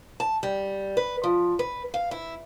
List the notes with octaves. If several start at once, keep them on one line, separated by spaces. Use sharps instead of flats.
A5
G3
B4
F3
B4
F5
E4